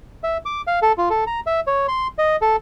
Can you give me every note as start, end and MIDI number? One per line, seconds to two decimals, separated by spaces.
0.24 0.37 76
0.46 0.61 86
0.67 0.79 77
0.82 0.92 69
0.98 1.09 65
1.10 1.24 69
1.27 1.40 82
1.46 1.60 76
1.67 1.87 73
1.88 2.07 84
2.18 2.36 75
2.42 2.56 69